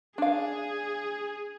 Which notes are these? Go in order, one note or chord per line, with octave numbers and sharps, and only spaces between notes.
D4 G#4 F5